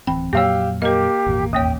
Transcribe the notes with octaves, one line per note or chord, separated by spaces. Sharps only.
D1 E3 C4 G5 B5
F2 A#2 F#3 A#3 G4 C#5 F5 E6
A#3 G4 A#4 D#5
G#1 E2 A#2
D#2 A#3 C#5 G5 D#6